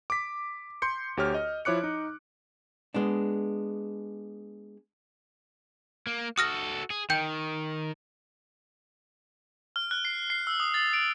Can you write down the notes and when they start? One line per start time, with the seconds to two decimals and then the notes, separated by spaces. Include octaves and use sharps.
0.10 D6 B6
0.82 C6 G6 C#7
1.17 D2 G4 C#5 F6
1.34 D#5
1.65 F3 E4 C#5 D6 F#6 C#7
1.84 D#4
2.94 G#3 B3 D4
6.07 A#3
6.38 F#4 A4 D#6 F6 A#6
6.90 G#4
7.10 D#3 G5 G6
9.76 F6
9.91 F#6
10.05 C7
10.30 C7
10.47 E6
10.60 D#6
10.74 A6
10.93 D7